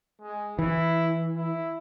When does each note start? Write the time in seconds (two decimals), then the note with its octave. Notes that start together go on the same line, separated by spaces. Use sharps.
0.22 G#3
0.59 E3 E4
1.37 E4